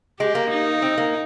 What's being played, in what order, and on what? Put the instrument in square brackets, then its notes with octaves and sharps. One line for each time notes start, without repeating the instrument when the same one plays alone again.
[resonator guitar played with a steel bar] G#3 [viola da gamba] G4
[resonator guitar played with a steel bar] A#3
[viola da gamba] D#4
[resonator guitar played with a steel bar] C4
A#3